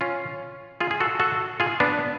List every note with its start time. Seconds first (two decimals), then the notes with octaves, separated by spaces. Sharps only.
0.01 C#4 F4
0.80 F4 G#4
0.91 G#4
1.00 F#4 A4
1.20 F#4 A4
1.60 F4 G#4
1.80 B3 D4